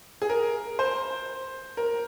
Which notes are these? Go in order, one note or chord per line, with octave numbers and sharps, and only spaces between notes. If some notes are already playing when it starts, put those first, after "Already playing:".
G#4
A#4
C5
A#4